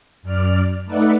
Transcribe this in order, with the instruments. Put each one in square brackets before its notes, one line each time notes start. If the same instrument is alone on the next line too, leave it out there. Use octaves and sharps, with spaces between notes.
[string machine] F#2 D5 F6
A3 D#4 B4 D5 E5 F#5